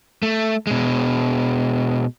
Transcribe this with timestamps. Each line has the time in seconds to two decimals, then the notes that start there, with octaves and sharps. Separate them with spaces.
0.23 A3
0.67 B2 G#3